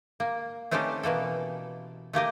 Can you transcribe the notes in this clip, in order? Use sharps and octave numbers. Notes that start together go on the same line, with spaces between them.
A#3
A3 C4 C#4 D#4 G4 A4
B2 E3 A#3 A4
A3 A#3 G4 D#5